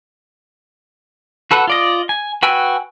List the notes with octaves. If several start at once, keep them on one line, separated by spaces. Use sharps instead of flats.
F#4 A4 B4 F#5
F4 D5 D#5
G#5
F#4 B4 G5 G#5 E6